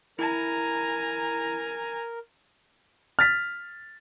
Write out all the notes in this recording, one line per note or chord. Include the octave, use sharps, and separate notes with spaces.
E4 A#4 G#5 A#5
F6 A6 B6